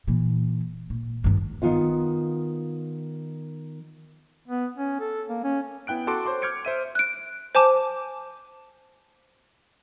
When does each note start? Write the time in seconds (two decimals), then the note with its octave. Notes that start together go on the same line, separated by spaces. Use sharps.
0.07 A#2 E3
0.90 A#2
1.24 G2 D#3
1.62 D#3 B3 F4 F5
4.48 B3
4.77 C#4
5.00 A4
5.27 A#3
5.44 C#4
5.87 B3 E4 G5 F#6 D7
6.07 F#4 A4 A5 C6 D6 D7
6.26 C5 C#5 C6 D6
6.42 D6 F6 G6 G#6 C#7 D7
6.65 C5 E5 D#7
6.95 F#6 D7
7.55 C5 G#5 A5 D6